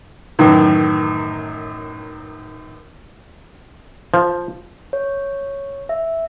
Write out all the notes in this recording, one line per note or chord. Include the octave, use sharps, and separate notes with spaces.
F#2 A2 D#3 E3
F3
C#5
E5